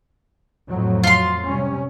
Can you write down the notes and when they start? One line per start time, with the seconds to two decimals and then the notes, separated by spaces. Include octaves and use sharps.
0.69 F2 A2 F#3
1.04 F4 C6
1.47 C3 G3 C#4